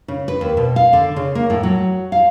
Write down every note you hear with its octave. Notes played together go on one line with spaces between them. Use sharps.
C#3
B4
D#2
B2
F5
D3
C#3
A#3
A2
F#3
F5